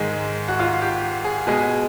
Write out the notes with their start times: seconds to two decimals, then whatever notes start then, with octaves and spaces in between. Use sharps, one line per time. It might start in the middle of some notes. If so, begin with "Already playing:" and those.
Already playing: G#2 D#3 G#3 G#4
0.48 F#4
0.59 F4
0.81 G4
1.25 G#4
1.47 B2 G#3 G#4